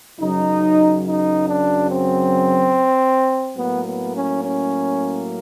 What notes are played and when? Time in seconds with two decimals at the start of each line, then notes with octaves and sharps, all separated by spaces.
0.20 F#2 C#3 F#3 D#4
1.05 D#4
1.46 D4
1.88 C4
3.56 A2 F#3 A#3 B3
3.85 B3
4.13 C#4
4.41 C#4